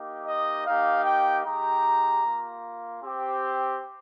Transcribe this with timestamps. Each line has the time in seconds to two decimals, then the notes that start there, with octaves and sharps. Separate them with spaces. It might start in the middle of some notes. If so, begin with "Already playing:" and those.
Already playing: A#3 D#4 G4
0.27 D#5
0.65 A#3 D#4 G4 F5
1.05 G5
1.44 G#3 D#4 G4 A#5
2.24 A#3 F4
3.03 C4 G4